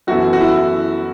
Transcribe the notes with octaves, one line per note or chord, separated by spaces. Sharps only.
F#2 E3 B3 E4 F#4 A4
F#4
E4